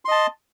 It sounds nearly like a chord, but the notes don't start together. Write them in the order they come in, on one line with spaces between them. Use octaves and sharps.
C6 D#5 A5